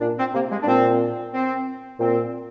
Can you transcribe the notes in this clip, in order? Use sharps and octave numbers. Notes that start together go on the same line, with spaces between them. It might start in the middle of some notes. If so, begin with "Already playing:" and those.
A#2 D4
C4
C3 A#3
G#3
D4
A#2 C4
C4
A#2 C4